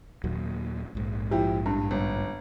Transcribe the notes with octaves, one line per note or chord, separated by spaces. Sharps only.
D#2 A#2 F#3
A#1 G#2
F3 E4 G4
G2
G1